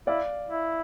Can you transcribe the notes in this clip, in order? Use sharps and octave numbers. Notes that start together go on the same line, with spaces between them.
E4 D5 F5
E4